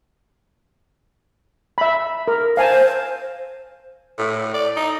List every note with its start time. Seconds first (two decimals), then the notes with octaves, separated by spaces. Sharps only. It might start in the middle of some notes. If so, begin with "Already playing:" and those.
1.78 E5 B5
2.28 A#4
2.57 C5 F5 G#5 A5
4.18 A2
4.54 D5
4.76 D#4